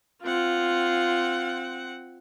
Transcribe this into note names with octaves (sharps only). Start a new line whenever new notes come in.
C4 F4 F#5